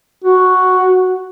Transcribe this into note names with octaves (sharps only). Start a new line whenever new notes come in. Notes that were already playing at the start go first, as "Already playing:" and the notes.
F#4